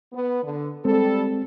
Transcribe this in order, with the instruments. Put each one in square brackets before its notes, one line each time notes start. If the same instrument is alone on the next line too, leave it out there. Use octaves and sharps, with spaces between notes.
[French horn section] B3
D3
[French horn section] G3 A4 [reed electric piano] G#3 C4